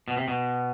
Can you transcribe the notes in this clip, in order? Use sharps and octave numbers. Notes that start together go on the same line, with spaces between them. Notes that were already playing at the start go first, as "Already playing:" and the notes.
B2
C3
B2